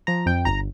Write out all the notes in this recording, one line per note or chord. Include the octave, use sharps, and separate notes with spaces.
F3 A#5
F2 G5
G1 A#5